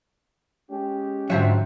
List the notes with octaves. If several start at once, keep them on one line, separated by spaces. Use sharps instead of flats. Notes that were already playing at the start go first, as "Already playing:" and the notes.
G#3 C#4 G4
G#2 D3 F3 F#3 E5